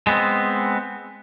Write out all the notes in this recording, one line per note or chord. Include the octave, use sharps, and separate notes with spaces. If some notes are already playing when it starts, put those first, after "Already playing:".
G#3 B3 C4